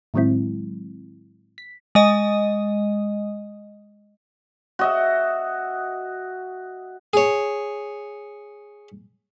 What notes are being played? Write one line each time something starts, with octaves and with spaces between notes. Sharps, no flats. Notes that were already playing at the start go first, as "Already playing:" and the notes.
A2 D#3 F#3 G#3 C4 E4
B6
G#3 D#5
F#4 D#5 E5
G#4 C#5